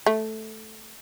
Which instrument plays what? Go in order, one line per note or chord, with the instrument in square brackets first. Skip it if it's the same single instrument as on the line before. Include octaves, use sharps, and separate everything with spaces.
[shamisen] A3